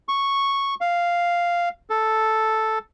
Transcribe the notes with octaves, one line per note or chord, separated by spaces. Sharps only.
C#6
F5
A4